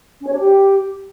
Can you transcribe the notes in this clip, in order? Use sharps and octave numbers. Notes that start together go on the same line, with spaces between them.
C#4
C#5
D4
G4